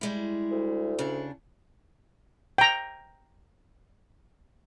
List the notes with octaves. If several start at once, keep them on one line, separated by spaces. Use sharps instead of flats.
G3 G#3 E4
D2
C#3 D4
G5 A#5